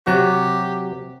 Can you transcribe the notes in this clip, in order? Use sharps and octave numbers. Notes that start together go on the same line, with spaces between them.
C3 F#3 F#4 G4